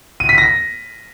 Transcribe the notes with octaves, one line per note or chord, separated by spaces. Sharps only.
D#7
B6
A#6